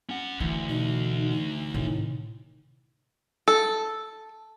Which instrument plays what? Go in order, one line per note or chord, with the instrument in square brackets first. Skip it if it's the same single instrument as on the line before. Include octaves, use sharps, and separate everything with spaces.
[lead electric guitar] C#4 F#5
[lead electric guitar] D2 [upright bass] E3
[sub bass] B2 [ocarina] D#4
[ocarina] D#4
[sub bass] A2 [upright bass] C3 D#3
[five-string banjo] A4